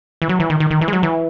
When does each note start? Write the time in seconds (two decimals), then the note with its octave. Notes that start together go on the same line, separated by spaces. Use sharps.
0.22 E3
0.29 F#3
0.40 E3
0.50 D#3
0.60 D#3
0.71 D#3
0.81 E3
0.88 G#3
0.93 F#3
1.03 E3